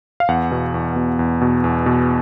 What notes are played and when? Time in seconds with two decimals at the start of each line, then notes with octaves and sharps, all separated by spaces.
0.20 F5
0.28 E2 F#5
0.52 B2
0.74 E2
0.96 B2
1.19 E2
1.41 B2
1.64 E2
1.86 B2